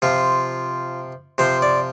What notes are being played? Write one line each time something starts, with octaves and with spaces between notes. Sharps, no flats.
C3 F3 F4
C3 F3 C5
D5